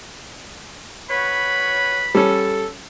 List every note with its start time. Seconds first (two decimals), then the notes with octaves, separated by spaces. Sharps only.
1.10 F#4 B4 C#5 B5
2.15 G3 C#4 A4